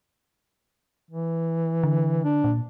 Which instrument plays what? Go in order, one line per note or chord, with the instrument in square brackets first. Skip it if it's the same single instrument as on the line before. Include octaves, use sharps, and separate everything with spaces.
[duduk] E3
[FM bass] D3
[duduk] D4
[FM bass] A#2